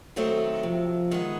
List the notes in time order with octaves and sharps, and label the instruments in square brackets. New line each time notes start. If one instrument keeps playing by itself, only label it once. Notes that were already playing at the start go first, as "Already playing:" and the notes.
[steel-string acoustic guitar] D#3 F#3 A3 C4
[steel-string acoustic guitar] C3 [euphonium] F3
[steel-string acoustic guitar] D#3 G#3 B3